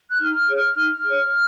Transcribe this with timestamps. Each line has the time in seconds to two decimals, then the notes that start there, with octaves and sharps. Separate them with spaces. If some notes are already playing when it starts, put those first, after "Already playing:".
0.10 F#6
0.19 D#4 F6
0.48 G#4 C#5
0.76 D#4
1.04 G#4 C#5